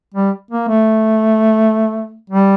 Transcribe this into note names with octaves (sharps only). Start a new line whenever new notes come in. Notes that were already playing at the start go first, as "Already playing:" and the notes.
G3
A#3
A3
G3